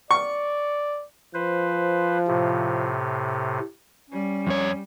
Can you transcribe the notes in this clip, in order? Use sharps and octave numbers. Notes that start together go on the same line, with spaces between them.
D5 C#6
F3 B4 C5
A2 C3
G3 C#4
F2 C#5